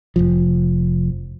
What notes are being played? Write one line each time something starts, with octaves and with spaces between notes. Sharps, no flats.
F1 B1 F3